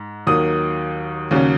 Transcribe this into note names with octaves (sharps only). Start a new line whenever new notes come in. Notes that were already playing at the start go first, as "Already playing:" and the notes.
Already playing: G#2
D#2 D#3 F#3 D#6
D#2 C#3 F#3 C#4